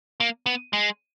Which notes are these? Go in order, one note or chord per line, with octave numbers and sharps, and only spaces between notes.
A#3
B3
G#3